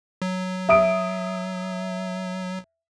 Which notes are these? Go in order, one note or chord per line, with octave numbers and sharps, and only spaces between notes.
F#3
E5 D#6 D7